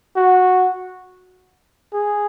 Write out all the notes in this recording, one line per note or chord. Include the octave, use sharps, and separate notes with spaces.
F#4
G#4